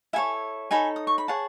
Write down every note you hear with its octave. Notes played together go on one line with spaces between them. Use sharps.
E4 A4 C#5 E5 G#5
D#4 A4 C#5 G#5 B5
D#6
C#6
B5
G#4 C#5 F#5 A5